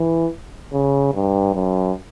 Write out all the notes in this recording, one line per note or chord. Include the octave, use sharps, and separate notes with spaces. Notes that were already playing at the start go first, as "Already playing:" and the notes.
Already playing: E3
C#3
G2
F#2